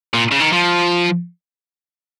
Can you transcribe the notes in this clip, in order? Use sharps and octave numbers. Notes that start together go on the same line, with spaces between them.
A#2
C#3
D#3
F3